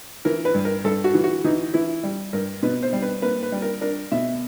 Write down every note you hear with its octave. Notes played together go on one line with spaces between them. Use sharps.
E3 A#4
B4
G2
A#4
G2 A4
F#4
E3
F#4
E3 D#4
E3 E4
G3
G2 A#4
B2 B4
C5
G3
B4
A#3 B4
B4
G3
A#4
D4 A#4
B2 E5